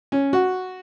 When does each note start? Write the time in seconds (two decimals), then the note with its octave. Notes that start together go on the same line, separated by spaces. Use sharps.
0.12 C#4
0.33 F#4